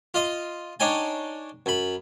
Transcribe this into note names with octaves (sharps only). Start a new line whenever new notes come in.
F4 D#5
D4 D#4 C#5 G5 G#5
F#2 B5